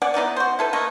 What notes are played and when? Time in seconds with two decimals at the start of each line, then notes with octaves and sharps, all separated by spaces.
0.02 B3 D5 F#5 G#5
0.14 B3 D#4 E4 D5
0.36 F#4 C5
0.59 E4 A4 B4
0.73 A3 A#3 D#4 B4